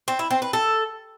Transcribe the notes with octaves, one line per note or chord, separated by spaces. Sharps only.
C4
E4
C4
B4
A4